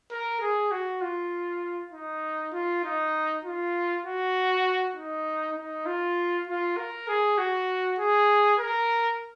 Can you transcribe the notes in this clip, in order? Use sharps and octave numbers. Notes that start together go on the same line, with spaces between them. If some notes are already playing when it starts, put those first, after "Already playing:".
A#4
G#4
F#4
F4
D#4
F4
D#4
F4
F#4
D#4
D#4
F4
F4
A#4
G#4
F#4
G#4
A#4